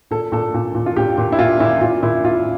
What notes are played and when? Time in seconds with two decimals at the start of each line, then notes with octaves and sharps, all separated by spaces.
0.11 A#2 A4
0.32 A#2 A4
0.54 A#2
0.75 A#2
0.86 F4
0.96 A#2 G4
1.18 A#2
1.32 E4
1.39 A#2 F4
1.60 A#2 E4
1.81 A#2 F4
2.03 A#2 E4
2.24 A#2 F4